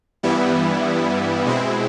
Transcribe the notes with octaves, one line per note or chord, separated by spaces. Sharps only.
G2 E3 G3 B3 E4
B2 G#3 C4 E4